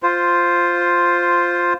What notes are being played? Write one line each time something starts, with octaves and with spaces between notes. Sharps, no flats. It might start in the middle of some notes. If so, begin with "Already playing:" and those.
F4 C5